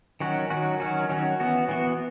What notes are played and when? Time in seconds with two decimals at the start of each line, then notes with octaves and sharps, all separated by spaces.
0.20 D#3 F#3 C#4 F#4
0.50 D#3 F#3 C#4 F#4
0.80 D#3 F#3 C#4 F#4
1.09 D#3 F#3 C#4 F#4
1.40 E3 B3 F#4
1.69 E3 B3 F#4